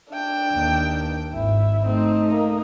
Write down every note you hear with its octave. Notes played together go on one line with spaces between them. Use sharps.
D4 G5
D#2
G#1 E4
A3 C4 D#4
A#3